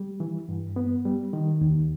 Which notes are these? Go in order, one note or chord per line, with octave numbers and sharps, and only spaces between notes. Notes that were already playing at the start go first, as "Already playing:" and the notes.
Already playing: G3
E3
G2
B3
G3
D#3
D#2